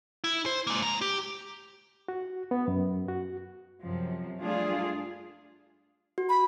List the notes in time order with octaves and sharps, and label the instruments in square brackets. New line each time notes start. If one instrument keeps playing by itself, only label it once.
[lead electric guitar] E4
C5
G#3 A#3
G#3 A#5
G4
[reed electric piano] F#4
B3
F#2
F#4
[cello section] F#2 C3 F3
G3 A3 D4 F4 G#4
[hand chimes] F#4
[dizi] B5